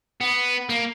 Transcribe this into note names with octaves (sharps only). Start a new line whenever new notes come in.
B3
A#3